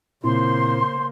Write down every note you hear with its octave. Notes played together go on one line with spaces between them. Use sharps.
A#2 C#3 A#3 C4 E4 C5 C6